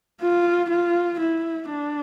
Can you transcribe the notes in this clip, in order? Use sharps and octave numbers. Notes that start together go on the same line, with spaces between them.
F4
F4
E4
D4